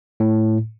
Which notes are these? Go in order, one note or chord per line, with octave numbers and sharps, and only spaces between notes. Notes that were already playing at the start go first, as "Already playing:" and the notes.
A2